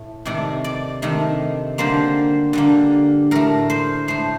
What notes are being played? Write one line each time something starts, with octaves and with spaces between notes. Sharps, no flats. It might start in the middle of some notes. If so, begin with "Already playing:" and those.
Already playing: A2 A3
C3 D#3 A3 D5
D5
C3 D#3 A3
D3 G3 A#3 C5
D3 G3 A#3
A2 A3 A#4
C5
A2 A3 C5